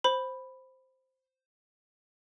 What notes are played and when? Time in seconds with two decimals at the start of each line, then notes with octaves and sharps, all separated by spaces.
0.04 C5 B5